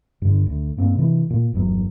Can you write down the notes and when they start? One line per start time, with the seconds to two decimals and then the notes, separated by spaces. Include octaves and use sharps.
0.22 G2 D3
0.47 D2
0.77 G2 A#3 C4
0.95 C3 E3
1.30 A#2
1.53 G1 E2 F#3